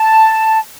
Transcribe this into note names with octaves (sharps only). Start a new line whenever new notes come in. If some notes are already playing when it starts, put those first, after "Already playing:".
Already playing: A5